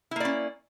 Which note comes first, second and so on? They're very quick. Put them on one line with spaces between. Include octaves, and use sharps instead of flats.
E4 A#3 D5 C#4